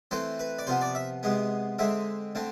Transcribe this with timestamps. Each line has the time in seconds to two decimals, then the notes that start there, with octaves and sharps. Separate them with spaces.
0.11 E3 A3 C4 C5
0.39 B4
0.59 D5
0.67 C3 F3 B3 C5
0.81 D5
0.95 E5
1.23 C3 G#3 B3
1.79 D3 G#3 C4 E5
2.35 D3 A3 C4